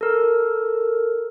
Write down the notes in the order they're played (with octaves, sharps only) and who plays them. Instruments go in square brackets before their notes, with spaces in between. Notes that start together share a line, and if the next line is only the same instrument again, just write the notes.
[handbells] A4 A#4